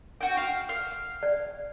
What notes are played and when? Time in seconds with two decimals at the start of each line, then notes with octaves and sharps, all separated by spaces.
0.21 F#4 G5
0.37 F5
0.69 F5
1.23 D5